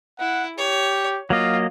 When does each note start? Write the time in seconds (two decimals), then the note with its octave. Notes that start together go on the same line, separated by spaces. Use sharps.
0.19 E4 F#5
0.58 G4 C#5
1.30 F#3 A#3 F4 D#5 F5